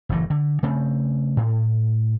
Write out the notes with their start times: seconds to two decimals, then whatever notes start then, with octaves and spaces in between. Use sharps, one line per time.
0.09 F#1 A2 E3
0.30 D3
0.63 C#3 A3 C4
1.37 A2